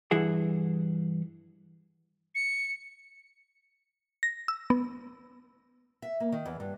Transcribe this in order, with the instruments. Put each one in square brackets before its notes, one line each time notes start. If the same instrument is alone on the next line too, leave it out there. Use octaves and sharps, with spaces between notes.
[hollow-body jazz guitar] G2 E3 E4 G#4 F#5
[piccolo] C#7
[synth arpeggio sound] A#6
E6
B3
[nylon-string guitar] E5
A#3
D#3
E2
G2